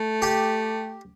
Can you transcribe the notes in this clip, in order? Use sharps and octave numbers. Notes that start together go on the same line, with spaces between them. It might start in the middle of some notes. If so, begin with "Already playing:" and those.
Already playing: A3
G4